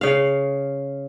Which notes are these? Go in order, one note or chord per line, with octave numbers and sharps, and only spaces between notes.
C#3 F5